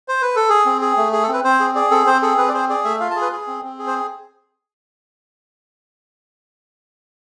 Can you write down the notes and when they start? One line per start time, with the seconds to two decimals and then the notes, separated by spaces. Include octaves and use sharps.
0.08 C5
0.22 B4
0.36 A4
0.50 G#4
0.66 C4
0.81 G#4
0.97 A3
1.13 G#4
1.23 A4
1.28 C4
1.33 B4
1.44 C4 C5
1.60 G#4
1.75 G#4 D5
1.91 C4 A4
2.06 C4 C5
2.22 G#4 A4
2.38 C4 B4
2.49 D5
2.54 G#4 C5
2.69 G#4 D5
2.85 A3 E5
3.00 F4 F5
3.11 A5
3.16 G#4
3.22 B4
3.32 G#4
3.47 C4
3.63 C4
3.79 G#4
3.87 C5